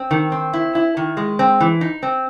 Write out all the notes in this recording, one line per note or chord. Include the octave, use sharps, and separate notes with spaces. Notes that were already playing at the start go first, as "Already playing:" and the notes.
Already playing: C4
D#3
C4
E4
E4
D#3
G#3
C4
E3
D#4
C4